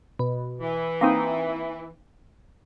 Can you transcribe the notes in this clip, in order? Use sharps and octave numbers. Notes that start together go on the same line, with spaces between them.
B2
E3
A#3 C4 D#4